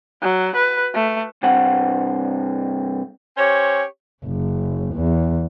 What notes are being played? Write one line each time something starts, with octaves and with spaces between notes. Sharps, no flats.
F#3
B4
A3
C2 G2 C4 F#5
C#4 G4 C5 C#5
F#1
E2